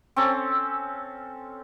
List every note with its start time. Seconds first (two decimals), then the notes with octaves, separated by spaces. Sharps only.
0.16 C4 C#4 A4